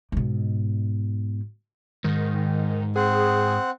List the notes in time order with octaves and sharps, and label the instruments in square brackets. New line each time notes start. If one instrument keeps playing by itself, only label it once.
[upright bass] G#2 B2
[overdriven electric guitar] G#2 [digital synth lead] D#3
[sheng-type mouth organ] C4 F#5 [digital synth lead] G#4